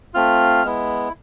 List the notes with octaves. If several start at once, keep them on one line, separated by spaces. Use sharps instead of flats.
A3 C4 F4 F6
G#3 B3 E4